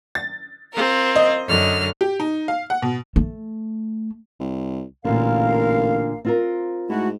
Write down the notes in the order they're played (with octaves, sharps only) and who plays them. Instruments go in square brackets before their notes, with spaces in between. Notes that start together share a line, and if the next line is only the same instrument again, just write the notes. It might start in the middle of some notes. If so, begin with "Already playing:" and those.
[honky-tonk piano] A6
[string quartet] C4 F4 A#4
[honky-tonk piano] D#5
[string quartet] F#2 D3 F6
[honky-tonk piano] G4
D#4
F5
F#5
B2
[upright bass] A3
[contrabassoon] C2
[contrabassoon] A1 [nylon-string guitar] A#2 D3 [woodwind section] A#4 F5
[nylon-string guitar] C4 F4 A#4
[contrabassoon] G#2 [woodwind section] A3 E4 F#4